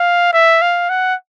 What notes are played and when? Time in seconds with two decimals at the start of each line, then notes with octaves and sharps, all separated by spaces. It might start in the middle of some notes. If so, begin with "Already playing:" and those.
Already playing: F5
0.33 E5
0.62 F5
0.90 F#5